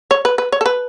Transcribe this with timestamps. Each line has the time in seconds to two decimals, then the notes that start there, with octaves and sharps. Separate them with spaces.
0.11 C#5
0.25 B4
0.38 B4
0.52 C#5
0.61 A4
0.66 B4